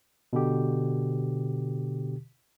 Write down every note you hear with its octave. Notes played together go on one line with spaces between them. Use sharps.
B2 D3 G4